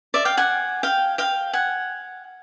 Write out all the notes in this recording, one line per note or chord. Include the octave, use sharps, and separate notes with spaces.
D5 E5
F5 G5
F#5 G#5
F5 G5
F5 G5
F#5 G#5